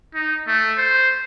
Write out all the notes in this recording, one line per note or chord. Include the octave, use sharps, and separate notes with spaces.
D#4
A3
C5